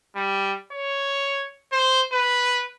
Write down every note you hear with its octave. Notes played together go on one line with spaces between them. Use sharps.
G3
C#5
C5
B4